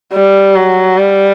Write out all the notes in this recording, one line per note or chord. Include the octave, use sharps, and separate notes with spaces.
G3
F#3
G3